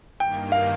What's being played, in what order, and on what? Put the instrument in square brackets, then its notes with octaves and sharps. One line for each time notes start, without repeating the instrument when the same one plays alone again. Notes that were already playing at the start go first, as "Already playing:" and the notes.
[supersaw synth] G2 D#3 A#3 [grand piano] G5
[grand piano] F5